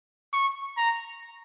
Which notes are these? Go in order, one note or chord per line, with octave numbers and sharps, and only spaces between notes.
C#6
A#5